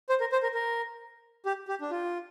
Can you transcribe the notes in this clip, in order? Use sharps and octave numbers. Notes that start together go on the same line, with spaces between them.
C5
A#4
C5
A#4
A#4
G4
G4
D4
F4